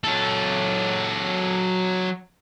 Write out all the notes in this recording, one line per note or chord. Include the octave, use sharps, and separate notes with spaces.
F#3 A4